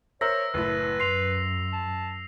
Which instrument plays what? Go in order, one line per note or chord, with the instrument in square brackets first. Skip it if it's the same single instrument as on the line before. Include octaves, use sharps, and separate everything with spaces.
[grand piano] A#4 C5 E5 [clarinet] C#5 [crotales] E6 A#6
[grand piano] F#1 A2 E4 [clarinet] B4
[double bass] F#2 [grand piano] C6 [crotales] C7 F7
[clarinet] A5